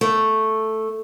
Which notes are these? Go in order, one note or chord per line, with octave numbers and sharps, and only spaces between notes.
A3